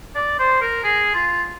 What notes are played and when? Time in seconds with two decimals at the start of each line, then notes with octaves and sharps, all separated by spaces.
0.15 D5
0.39 C5
0.61 A#4
0.84 G#4
1.14 F4